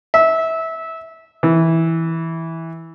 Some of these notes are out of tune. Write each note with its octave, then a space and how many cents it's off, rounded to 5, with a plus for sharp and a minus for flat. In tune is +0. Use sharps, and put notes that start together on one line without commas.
E5 -20
E3 -10